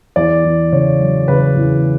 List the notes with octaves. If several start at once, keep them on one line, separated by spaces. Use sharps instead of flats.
E2 D5
E2
C#3 C#5
F#3
C#3 B4
E2